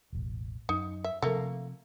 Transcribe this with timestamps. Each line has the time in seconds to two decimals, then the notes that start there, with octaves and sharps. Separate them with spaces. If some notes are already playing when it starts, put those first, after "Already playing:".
0.13 E1 A1
0.69 F#2 D#4
1.04 E5
1.22 C3 F3 A3 A#3